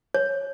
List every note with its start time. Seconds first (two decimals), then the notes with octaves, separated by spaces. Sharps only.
0.15 C#5